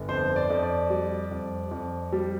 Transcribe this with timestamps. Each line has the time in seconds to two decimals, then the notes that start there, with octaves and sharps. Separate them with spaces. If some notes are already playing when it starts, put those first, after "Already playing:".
Already playing: G1
0.09 F2 C5
0.36 D5
0.50 F2
0.63 D5
0.90 G3
1.31 F2
1.71 F2
2.13 G3